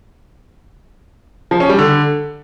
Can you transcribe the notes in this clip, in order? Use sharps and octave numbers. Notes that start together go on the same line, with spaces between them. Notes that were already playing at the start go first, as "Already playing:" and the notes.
F3
C#4
G3
D3